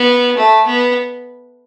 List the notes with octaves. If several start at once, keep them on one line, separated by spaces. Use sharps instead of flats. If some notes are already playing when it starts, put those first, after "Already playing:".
Already playing: B3
A3
B3